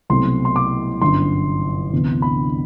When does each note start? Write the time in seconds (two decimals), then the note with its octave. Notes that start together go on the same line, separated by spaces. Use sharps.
0.10 C2 B2 F#3 A3 C4 C6
0.45 C6
0.56 D6
1.01 G1 F#2 F#3 C6
1.93 D2 C3 E3 B3
2.22 B5